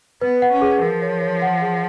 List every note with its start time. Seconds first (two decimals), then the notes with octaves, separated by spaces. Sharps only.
0.21 B3 B4
0.42 F#5
0.52 C#4
0.62 G#4
0.81 F3 A#4
1.02 C#5
1.21 C#5
1.42 F#5
1.62 G#4